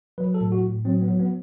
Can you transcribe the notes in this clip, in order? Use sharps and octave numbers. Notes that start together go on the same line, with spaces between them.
F#3 B4
A4
A2
F#4
A2
F#3 C4
B3
F#3
B3